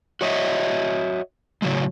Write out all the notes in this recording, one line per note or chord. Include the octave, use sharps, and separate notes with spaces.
F#4 C#5 D#5 E5
A2 C#3 F#3 G#3